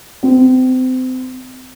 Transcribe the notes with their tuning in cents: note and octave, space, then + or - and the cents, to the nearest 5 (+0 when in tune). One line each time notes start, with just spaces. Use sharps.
C4 -30